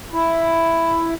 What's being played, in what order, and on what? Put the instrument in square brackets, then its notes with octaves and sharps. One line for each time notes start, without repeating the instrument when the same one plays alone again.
[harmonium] E4